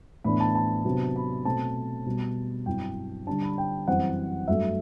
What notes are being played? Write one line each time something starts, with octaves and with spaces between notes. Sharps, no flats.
A2 E3 B3 D4 B5
A5
A5
C3 F#3 B3 D4
B5
B2 A3 C4 A5
B2 G3 B3
G2 F#3 C4 E4 G5
D3 G3 D4 A5
B5
G5
F#2 E3 G3 C4 F#5
G2 F#3 A3 E5